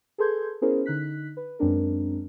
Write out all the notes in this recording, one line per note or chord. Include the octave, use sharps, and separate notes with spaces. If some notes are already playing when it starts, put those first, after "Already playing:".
G#4 A4 B4 C6 G6 G#6
B3 C#4 E4 G#4 A#4 C5
D3 D#4 F#6 B6
B4
F#2 G#3 C4 D4 A#4